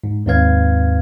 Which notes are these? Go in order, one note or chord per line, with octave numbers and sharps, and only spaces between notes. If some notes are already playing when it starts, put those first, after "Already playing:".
G#2
D#2 G#2 C4 B4 F5 G#6